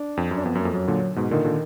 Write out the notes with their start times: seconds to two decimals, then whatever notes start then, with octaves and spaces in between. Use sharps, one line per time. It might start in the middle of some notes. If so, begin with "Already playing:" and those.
Already playing: D4
0.17 F2
0.31 F#2
0.36 D4
0.45 F2 B3
0.55 F#2
0.59 A#3
0.65 F2
0.74 F#2 F#3
0.88 A#2 D3
1.16 G#2 B2
1.31 A#2 D3 D#3
1.44 A#2 D3